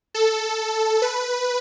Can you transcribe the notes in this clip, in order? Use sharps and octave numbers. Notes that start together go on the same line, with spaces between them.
A4
B4